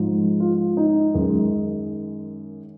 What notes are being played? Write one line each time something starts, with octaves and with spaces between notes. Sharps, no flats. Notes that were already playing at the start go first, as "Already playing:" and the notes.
Already playing: G#2 F3 G#3
F4
D#4
F#2 D#3 G#3